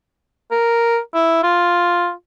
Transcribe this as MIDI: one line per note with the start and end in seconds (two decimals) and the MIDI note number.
0.51 0.99 70
1.14 1.42 64
1.44 2.11 65